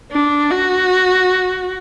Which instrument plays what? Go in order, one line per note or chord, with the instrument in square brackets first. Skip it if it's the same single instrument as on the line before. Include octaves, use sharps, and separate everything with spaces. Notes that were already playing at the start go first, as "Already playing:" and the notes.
[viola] D4
F#4